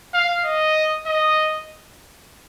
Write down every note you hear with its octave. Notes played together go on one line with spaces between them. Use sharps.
F5
D#5
D#5